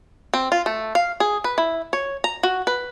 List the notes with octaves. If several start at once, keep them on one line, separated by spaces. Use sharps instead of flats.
C4
F4
A3
F5
G#4
B4
E4
C#5
A#5
F#4
B4